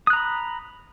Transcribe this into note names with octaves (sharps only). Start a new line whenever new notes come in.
A#5 B5 D#6 F#6